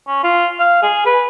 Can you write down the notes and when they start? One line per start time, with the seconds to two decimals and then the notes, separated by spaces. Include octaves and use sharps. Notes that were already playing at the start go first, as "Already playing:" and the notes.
0.08 C#4
0.24 F4
0.60 F5
0.83 G#4
1.06 B4